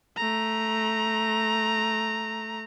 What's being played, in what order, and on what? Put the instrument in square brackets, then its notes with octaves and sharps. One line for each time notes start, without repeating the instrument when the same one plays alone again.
[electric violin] A3 A#5